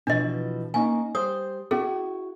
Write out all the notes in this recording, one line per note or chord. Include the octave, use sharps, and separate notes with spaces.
B2 E3 F3 D4 D#5
A#3 C#4 D#4 G#5
G3 C5 D#6
C#4 E4 F#4 G#4